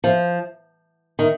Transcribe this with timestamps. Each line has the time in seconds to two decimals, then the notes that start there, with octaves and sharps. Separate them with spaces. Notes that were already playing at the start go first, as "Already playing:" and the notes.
0.04 F3
1.19 D#3